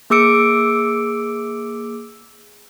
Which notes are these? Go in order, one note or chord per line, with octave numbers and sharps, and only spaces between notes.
A#3 G#4 D6 E6 C#7 D7